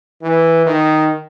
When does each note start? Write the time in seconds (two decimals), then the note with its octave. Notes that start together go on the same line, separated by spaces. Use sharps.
0.22 E3
0.66 D#3